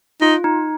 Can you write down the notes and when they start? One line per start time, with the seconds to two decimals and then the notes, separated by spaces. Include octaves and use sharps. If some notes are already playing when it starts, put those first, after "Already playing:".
0.21 D#4 F4
0.44 D#4